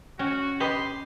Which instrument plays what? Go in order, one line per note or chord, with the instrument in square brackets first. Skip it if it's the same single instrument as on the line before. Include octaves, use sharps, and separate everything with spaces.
[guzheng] C#4 [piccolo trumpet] F#4 [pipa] G5
[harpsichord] G4 [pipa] B4 D#5 B5 [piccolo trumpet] C6